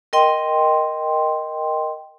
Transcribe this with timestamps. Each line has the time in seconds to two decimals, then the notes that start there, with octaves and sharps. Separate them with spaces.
0.13 A#4 D#5 G5 C6